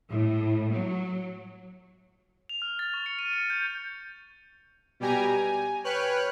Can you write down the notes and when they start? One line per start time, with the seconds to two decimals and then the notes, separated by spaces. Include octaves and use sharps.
0.10 A2
0.72 F#3
2.49 F7
2.62 F6
2.79 A6
2.94 C#6
3.06 C#7
3.19 D#7
3.33 C#7
3.50 G6
5.00 B2 G3 G4 G#5 A#5
5.34 G#5
5.84 B4 C#5 G5 F6 F#6